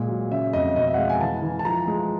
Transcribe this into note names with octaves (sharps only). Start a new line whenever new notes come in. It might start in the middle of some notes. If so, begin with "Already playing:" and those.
Already playing: A#2 G#3
F#3
C#3 E5
F2 D#5
B2 D#5
E5
F#5
G#3 F5
G#5
E3 A5
E3
A5
F3 A#5
G#3